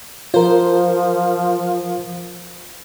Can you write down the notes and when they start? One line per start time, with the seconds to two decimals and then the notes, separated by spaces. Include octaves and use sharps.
0.34 F3 F4 A#4 C5